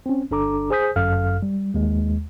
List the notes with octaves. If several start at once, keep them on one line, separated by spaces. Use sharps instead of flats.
C4 C#4
G1 D4 A4 A#5 D6
G#4 C5 G#5 D#6 G6 B6
G1 F#2 A4 F5 F6
G3
D#2 G#3